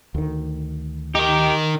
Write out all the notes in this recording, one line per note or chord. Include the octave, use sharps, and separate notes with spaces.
D2 D#3
D#4 G4 A#4